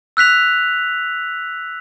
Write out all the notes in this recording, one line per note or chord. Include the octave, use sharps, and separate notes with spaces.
E6 F#6 B6 F7